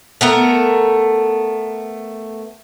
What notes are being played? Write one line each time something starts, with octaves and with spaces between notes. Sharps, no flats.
A3 B3 A#4